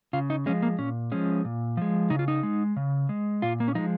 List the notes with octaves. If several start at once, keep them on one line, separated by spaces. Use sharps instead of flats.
C#3 F4
D#4
F3 G#3 C#4
A#3
A#2 C#4
F3 G#3 C#4
A#2
F3 G#3
C#3 D#4
F4
D#4
G#3
C#3
G#3
A#2 F4
A#3
C#4
F3 G#3 D#4